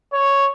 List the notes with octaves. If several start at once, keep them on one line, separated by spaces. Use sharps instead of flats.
C#5